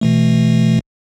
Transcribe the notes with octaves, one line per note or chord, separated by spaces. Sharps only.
B2 E3 A3